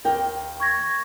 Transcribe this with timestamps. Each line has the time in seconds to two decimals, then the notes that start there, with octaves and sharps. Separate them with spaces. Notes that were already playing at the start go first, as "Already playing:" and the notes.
0.04 D#2 A#4 G5
0.60 C#6 G#6 A#6